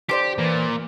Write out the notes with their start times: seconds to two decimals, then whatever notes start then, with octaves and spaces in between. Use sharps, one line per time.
0.09 D3 G4 C5 D5
0.38 A#2 E3